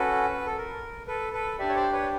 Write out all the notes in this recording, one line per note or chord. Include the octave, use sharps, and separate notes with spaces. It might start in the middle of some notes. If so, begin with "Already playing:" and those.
Already playing: C#4 F#4 A4 B4
A4
A#4
A4 B4
A4 B4
D4 G4 D5 E5
C#5
C5 D5
B4 C#5